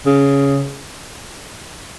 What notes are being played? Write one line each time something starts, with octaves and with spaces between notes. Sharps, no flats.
C#3